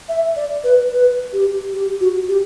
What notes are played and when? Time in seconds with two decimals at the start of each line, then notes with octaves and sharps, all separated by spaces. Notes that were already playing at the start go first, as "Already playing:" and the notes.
0.09 E5
0.36 D5
0.64 B4
0.91 B4
1.33 G4
1.74 G4
2.01 F#4
2.29 G4